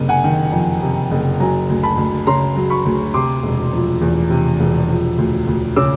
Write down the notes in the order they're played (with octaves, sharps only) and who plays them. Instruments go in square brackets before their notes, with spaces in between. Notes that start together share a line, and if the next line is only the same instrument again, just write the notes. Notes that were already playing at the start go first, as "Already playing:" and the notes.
Already playing: [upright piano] F#1 C3
F#5 G#5
D#3
F2
C3
F#1
F#3 G#5 A#5
D2
A5 B5
D2
C#3 A#5 C6
F#3
B5 C#6
D2
C3 C6 D6
E1
F3
E2
C3
E1
F3
D2
D2
C#3 D6 E6